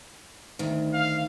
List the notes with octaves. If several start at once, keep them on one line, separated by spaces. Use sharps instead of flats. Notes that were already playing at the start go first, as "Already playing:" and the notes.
D2 D#3
F5